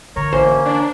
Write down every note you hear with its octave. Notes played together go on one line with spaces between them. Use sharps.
D3 E3 A#4 C#5
A1 A#3 C#4 C5
D4